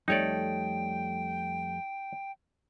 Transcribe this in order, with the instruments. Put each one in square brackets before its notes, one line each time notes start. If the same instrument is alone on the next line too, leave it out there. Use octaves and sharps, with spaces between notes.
[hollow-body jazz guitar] F2 G3 A3 [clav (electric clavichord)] D#4 C#5 D5 [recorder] G5